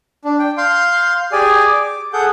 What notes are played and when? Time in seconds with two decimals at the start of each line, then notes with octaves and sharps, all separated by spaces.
0.25 D4
0.39 G5
0.57 F5 C6 G6
1.32 G4 G#4 D5 G#5
1.70 D6
2.13 G#4 A4 F#5 G6